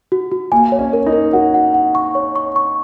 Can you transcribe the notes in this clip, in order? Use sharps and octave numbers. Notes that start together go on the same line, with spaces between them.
F#4
F#4
A#3 G#5
C#5
C#4
A#4
D#4
A#4
F#4 F#5
F#5
F#5
C#6
C#5
C#6
C#6